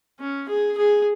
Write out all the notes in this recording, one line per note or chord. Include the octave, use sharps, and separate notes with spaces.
C#4
G#4
G#4